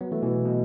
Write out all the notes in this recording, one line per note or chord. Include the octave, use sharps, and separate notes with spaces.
F#3 B3
E3 A3
B2 E3
B2